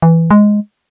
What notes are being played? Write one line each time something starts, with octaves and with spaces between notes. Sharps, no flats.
E3
G#3